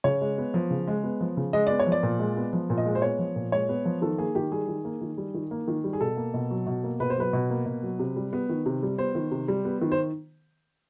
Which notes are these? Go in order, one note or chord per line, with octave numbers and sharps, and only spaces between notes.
C#3 C#5
G#3
B3
F3
C#3
G#3
B3
F3
C#3
G#3 D#5
B3 D5
C#5
F3
D5
A#2
G#3
B3
F3
A#2
D#5
G#3
C5
B3 C#5
F3
A#2
G#3 C#5
B3
F3
D#3 A4
A#3 G#4
D#3 G4
G3 G#4
D#3
A#3
D#3
G3
D#3
A#3
D#3
G3
G#4
B2 A4
A#3
B2
F#3
B2
A#3
B2 B4
C5
F#3 B4
B2
A#3
B2
F#3
C3
G3
B3
D#3
C3
G3
B3 C5
D#3
C3
G3
B3
D#3
C5